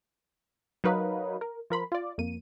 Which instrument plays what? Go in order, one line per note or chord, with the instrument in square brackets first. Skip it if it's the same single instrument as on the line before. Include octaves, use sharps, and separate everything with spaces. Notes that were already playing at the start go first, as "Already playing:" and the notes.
[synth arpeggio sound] F#3 D#4 A#4 B4 C#5 F5
A#4
F3 A#4 B5 C6
F4 D5
F2 A#3 D#7